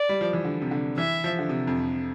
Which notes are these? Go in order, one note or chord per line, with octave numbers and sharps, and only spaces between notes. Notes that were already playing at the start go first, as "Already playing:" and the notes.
Already playing: D5
G3
F3
E3
D3
C3
D3
E3 E5
F3
D3
C3
F2